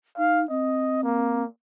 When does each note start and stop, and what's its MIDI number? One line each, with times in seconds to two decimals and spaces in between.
0.18 0.46 63
0.18 0.43 77
0.50 1.43 60
0.50 1.03 75
1.04 1.47 58